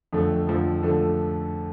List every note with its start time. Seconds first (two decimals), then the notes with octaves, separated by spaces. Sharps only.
0.13 F2 D3 F3 A3
0.47 F2 D3 F3 A3
0.83 D3 F3 A3